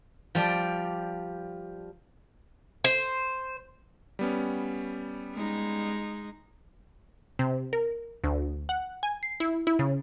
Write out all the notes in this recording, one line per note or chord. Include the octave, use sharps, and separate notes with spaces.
F3 G3 D5
C5
G3 B3 C#4
G#3 D#4
C3
A#4
D2
F#5
G#5
C7
E4
E4
C#3